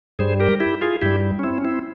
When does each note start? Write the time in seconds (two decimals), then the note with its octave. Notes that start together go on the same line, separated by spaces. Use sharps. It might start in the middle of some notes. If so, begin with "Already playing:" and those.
0.19 G2 G3 G#4 C5
0.40 G4 A#4
0.60 E4 G4
0.81 F4 G#4
1.02 G2 G3 E4 G4
1.39 C#4
1.43 C4 E4
1.58 C#4
1.65 C4 E4